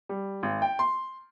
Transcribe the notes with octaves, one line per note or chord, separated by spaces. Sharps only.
G3
G#1
G5
C6